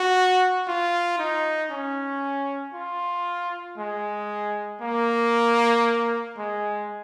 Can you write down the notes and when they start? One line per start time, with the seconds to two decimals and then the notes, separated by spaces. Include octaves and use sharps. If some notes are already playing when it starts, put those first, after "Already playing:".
Already playing: F#4
0.67 F4
1.19 D#4
1.71 C#4
2.74 F4
3.78 G#3
4.81 A#3
6.38 G#3